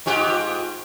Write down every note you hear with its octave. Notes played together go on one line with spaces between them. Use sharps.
G#2 F4 G4